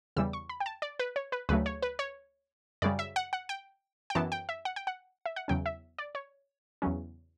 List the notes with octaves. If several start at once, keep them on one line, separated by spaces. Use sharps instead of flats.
E2 C#3 E3 G3 E6
C#6
B5
G5
A5
D5
B4
C#5
B4
D2 C#3 F#3 A3 B4
C#5
B4
C#5
F#2 C#3 G3 D5
E5
F#5
F#5
G5
G5
F#2 E3 B3 A5
G5
E5
F#5
G5
F#5
E5
F#5
E2 C#3 F#3 C#4 G5
E5
D5
C#5
E2 C#3 F#3 C#4